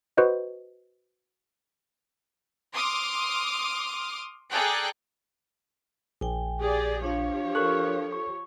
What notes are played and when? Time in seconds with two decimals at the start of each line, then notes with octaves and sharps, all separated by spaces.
0.17 F#4 B4 C5 D#5
2.72 C6 D6 D#6 F6
4.50 G#4 A4 D5 G5 A#5 F#6
6.21 A#1 G5 G#5
6.60 G4 G#4 D5
7.04 F3 D4 G4 C#5 F5
7.55 A4 A#4 C#6 F#6
8.12 C#6